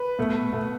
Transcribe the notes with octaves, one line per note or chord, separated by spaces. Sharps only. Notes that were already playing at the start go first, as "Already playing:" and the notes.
Already playing: B4
B2 A3
B2 A3